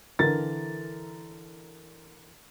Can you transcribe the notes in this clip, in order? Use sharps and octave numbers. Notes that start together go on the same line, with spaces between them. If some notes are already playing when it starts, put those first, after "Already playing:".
D3 E3 A#4 A6